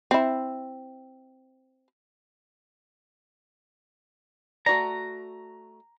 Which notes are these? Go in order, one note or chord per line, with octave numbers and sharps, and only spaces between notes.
C4 E4
A3 F#4 D5 A#5